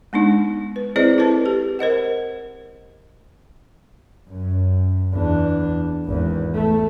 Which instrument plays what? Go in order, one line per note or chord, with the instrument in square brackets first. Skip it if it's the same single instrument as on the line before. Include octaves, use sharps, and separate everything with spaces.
[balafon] G#3 B3 D4 D#4
B4
C4 E4 G#4 C5 D5 D#5
E4 A4 B4 A5
G4
A#4 C5 D#5 F#5
[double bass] F#2
E2 D4
G#1 E2
A3